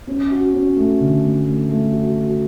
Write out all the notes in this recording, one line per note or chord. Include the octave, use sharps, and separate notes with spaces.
C#4
F#4
C#4
A3
D3
A3
A3
A3
F#4
F#4